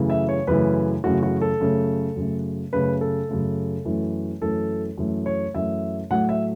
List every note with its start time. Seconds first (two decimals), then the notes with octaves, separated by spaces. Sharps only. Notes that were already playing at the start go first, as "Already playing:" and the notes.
Already playing: F#2 C#3 E3 A3
0.10 E5
0.29 C#5
0.47 F#2 C#3 E3 A3 B4
1.04 F#2 C#3 E3 A3 F#4
1.23 F#4
1.41 A4
1.60 F#2 C#3 A3
2.16 F#2 C#3 A3
2.73 F#2 C#3 A3 B4
3.01 A4
3.29 F#2 C#3 A3
3.85 F#2 E3 A3
4.41 F#2 E3 A3 A4
4.98 F#2 E3 A3
5.26 C#5
5.54 F#2 E3 A3 E5
6.10 A2 F#3 A3 F#5
6.29 E5